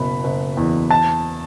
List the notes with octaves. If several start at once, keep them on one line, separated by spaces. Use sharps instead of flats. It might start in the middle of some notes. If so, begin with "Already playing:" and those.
Already playing: F#1 B2 B5
F#1
E2
A5